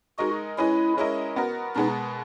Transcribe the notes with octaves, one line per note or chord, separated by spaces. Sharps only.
G#3 D#4 F#4 A#4 D#5
G#3 C#4 E4 G#4 B4 D#5
G#3 C#4 E4 A#4 D#5
B3 F#4 A#4
B2 G#3 B3 D#4